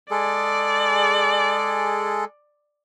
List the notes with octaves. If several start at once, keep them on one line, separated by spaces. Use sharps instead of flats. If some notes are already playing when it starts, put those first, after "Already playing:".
G#3 G#4 A4 D5